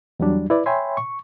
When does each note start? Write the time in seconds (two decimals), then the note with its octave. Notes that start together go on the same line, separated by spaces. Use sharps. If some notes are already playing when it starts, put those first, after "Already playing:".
0.20 E2 F#3 G3 D4
0.50 E4 B4 D5
0.66 C#5 E5 G5 G#5 B5 C6
0.97 C#6